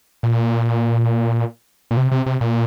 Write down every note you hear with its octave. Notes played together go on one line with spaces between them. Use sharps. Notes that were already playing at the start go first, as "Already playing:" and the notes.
A#2
A#2
C3
C3
C3
A#2